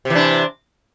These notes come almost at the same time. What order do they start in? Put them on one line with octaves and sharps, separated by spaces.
C3 E3 D4